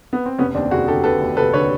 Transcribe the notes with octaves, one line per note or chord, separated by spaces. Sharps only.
B3
C4
F1 B3 C#4
D#2 C4 D4
F1 F#4 G#4
D3 G4 A4
F1 A4 B4
D#2
F1 A4 B4
D3 B4 C#5